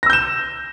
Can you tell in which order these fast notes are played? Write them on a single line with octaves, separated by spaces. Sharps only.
A#6 E6 G6 E7